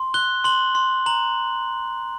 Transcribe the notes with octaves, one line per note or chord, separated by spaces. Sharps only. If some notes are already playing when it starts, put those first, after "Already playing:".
Already playing: C6
F#6 G7
C6 F#7
C6
A#5 F#7